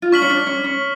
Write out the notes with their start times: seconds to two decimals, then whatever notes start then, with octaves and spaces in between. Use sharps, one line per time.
0.02 F4
0.12 D4 C#6 F6 B6 F#7
0.22 C#4
0.30 D4
0.47 C#4
0.64 C#4